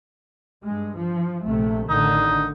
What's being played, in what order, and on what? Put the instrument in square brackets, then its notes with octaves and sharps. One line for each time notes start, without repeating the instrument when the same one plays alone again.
[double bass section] G2 G#3
F3
A#1 C3 A3
[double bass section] A1 D3 D#3 [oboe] D#4